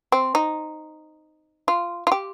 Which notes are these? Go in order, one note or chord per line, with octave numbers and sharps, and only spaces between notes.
C4
D#4
F4
F4
G4